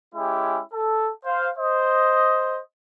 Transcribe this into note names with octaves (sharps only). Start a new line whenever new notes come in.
G#3 C#4 E4 G4
A4
C5 F5
C5 D#5